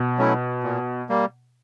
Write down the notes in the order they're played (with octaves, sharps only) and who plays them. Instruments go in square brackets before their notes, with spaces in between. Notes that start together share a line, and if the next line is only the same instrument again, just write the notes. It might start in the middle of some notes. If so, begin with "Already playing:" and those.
Already playing: [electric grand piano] B2
[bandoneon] F#3 A3 C#4 E4
A#2
G3 A#3